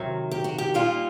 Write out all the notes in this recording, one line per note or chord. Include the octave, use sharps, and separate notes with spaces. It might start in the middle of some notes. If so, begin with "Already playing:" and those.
Already playing: C3 D#3 F#3
G4
F#4
G4
A#2 G3 A#3 D#4 F4